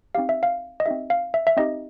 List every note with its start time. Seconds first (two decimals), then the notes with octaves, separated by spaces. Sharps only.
0.15 C4 D#4 G4 F5
0.29 E5
0.43 F5
0.80 D#5
0.86 C4 D#4 G4 E5
1.10 F5
1.34 E5
1.47 E5
1.57 C4 D#4 G4 D#5